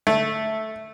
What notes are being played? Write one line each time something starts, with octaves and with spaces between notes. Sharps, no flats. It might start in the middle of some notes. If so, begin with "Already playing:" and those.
A3